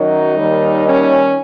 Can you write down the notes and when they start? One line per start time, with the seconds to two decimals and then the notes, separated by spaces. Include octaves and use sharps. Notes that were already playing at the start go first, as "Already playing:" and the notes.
Already playing: F#2 D#3 F#3 D#4
0.38 D#2 D#3 G3
0.86 C#4